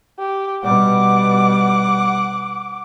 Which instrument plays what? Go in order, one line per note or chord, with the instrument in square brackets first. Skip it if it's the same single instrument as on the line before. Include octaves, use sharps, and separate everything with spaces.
[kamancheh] G4
[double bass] B2 G3 [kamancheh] F#5 D6